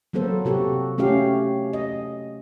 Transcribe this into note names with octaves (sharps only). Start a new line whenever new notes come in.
F#3 A#3 B3 A4 C5
C3 F#4 G4 A4
A3 C#4 F#4 G4 F5
D#5